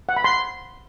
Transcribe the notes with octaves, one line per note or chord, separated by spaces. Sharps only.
F#5
B5
C6